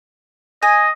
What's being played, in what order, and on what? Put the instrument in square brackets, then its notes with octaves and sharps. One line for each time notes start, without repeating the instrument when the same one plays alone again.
[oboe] D#5 [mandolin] G#5